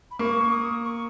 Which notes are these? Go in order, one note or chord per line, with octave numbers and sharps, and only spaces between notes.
B5
A#3 C#6
D#6
C#6